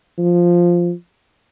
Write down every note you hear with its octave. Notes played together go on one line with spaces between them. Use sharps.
F3